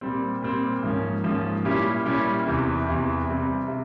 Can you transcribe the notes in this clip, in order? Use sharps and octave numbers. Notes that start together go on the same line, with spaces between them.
A#2 G3 C4
A#2 G3 C4
G#2 F3 A#3 C#4
G#2 F3 A#3 C#4
A#2 G3 C#4 E4 G4
A#2 G3 C#4 E4 G4
E2 C3 E3
E2 C3 E3
C3 G3 C4
C3